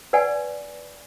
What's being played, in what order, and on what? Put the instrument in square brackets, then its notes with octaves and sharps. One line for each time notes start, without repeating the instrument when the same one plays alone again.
[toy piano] B4 D5 F#5 G#5